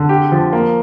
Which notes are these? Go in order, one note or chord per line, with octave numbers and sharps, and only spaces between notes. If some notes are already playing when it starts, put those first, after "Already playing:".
Already playing: D3
G4
F3
A#3